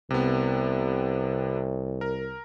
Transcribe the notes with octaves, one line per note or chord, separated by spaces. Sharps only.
C2 C3 B3
A#4